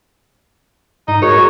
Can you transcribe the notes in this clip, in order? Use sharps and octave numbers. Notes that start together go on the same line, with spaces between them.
G#2 D#4
F#4 G#4 A#4 C#5